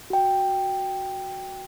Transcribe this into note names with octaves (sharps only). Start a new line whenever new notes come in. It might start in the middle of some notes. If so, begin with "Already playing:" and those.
F#4 G5